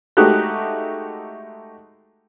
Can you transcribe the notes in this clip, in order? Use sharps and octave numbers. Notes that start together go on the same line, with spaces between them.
G#3 A3 D#4 F#4 G4 F#6